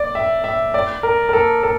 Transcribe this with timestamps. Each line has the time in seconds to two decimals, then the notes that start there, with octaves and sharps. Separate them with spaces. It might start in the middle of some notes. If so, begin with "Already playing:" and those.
Already playing: D5
0.15 E5
0.44 E5
0.74 D5
1.03 A#4
1.29 A#4
1.33 A4
1.63 A4